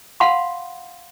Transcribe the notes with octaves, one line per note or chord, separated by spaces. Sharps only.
F5 F#5 B5 C6